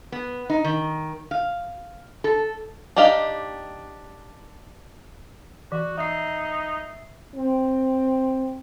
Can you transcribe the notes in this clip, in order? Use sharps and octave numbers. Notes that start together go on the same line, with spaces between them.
B3
D#4
D#3
F5
A4
D4 D#4 G4 D#5 F5
E3 F#4
D#4 E5 C7
C4